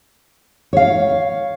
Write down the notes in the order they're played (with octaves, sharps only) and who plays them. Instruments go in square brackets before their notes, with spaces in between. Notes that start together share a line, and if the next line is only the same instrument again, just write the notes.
[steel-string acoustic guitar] C#5 F5